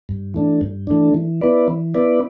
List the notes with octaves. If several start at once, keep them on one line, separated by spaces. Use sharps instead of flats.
G2
E3 A3 D4
G2
E3 A3 D4
E3
B3 E4 B4 D5
E3
B3 E4 B4 D5